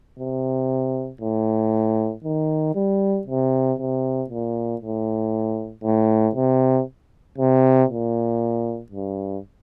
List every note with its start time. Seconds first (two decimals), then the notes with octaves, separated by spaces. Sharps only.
0.19 C3
1.21 A2
2.24 D#3
2.75 G3
3.27 C3
3.78 C3
4.30 A#2
4.81 A2
5.83 A2
6.35 C3
7.38 C3
7.89 A#2
8.92 G2